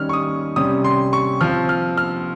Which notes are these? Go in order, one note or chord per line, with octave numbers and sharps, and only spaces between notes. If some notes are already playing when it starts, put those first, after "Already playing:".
Already playing: D#3 G3 C#4 F6
C#6
D#6
C3 G3 C#4 D#6
C6
C#6
F3 C4 F6
F6
F6